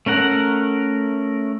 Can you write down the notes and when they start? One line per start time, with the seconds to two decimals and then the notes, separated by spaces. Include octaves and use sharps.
0.06 A3 C#4 A#4 F#5